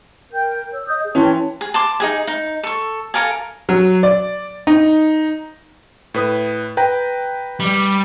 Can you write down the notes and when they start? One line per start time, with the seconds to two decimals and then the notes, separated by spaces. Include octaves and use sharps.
0.33 A#4 G5 G6
0.72 C#5 E6
0.87 D#5 D#6 G6
1.03 G#4
1.15 E3 C#4 G5 A5 C6
1.61 G#4
1.74 A5 C6 D6
2.00 D#4 G#4 G#5
2.27 D#4
2.63 A4 C#6
3.14 A4 A#4 F5 G#5
3.69 F#3
4.03 D5
4.67 D#4
6.14 A2 B4 D#6
6.77 B4 G5 A#5
7.60 G3